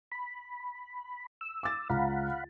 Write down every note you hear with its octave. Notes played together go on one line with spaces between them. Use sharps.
B5
E6
D6 A6
C#2 F5 F#5 A#5 B5